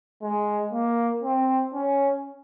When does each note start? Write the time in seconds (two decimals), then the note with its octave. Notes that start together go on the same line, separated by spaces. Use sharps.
0.22 G#3
0.73 A#3
1.23 C4
1.74 C#4